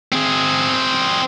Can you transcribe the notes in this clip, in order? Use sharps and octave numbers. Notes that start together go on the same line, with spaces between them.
C4 G#4